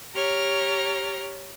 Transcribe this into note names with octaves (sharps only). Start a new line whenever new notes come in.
G4 C#5 A#5 F6